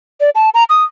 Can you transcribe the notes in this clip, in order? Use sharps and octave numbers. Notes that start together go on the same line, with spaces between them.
D5
A5
A#5
D#6